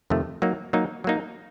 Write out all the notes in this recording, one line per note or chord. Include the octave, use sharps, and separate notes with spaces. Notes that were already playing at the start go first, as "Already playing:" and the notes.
F2 C3 D#3 A3
F#3 A#3 D#4
F#3 A#3 D#4
F#3 A#3 D#4